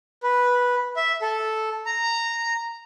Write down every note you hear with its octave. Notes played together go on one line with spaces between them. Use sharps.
B4
E5
A4
A#5